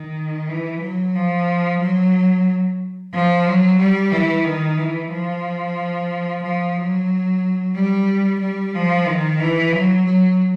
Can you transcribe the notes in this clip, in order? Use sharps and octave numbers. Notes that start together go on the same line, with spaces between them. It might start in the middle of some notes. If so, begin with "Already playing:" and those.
Already playing: D#3
E3
F#3
F3
F#3
F3
F#3
G3
E3
D#3
E3
F3
F3
F#3
G3
G3
F3
D#3
E3
F#3
F#3